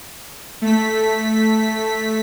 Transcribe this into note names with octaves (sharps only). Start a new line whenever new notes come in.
A3 B6